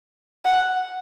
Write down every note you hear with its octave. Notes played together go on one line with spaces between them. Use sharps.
F#5